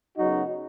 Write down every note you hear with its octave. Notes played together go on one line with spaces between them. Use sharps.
F#2 C#3 F#3 B3 D#4 F#4